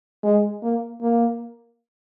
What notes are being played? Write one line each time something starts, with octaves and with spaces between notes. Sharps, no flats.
G#3
A#3
A#3